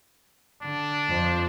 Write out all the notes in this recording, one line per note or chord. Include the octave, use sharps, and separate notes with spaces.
D3 D4
F2 F3 C5